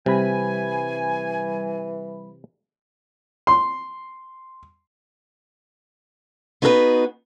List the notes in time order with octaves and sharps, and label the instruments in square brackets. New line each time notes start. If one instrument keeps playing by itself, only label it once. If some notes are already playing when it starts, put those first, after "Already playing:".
[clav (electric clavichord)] C3 [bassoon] E3 [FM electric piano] G3 B5 [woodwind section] G#5
[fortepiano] C6
[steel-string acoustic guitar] B3 D#4 F#4 G#4 A4 B4